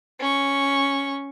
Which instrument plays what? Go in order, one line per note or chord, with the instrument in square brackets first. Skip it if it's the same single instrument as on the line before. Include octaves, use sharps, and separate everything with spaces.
[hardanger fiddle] C#4 C#6